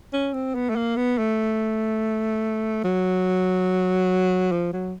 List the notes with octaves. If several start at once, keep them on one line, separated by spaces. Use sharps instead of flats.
C#4
C4
B3
A3
A#3
B3
A3
F#3
F3
F#3